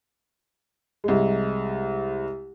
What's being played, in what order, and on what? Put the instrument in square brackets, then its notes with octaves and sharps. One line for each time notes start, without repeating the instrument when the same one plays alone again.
[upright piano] C2 G#3